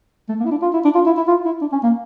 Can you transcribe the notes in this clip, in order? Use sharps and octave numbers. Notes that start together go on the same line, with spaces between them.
A3
A#3
E4
D4
F4
E4
D4
F4
E4
E4
F4
E4
D4
C#4
A#3